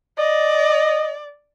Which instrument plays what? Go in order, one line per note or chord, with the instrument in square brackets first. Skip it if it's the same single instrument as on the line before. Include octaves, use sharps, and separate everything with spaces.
[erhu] D5 [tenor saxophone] D#5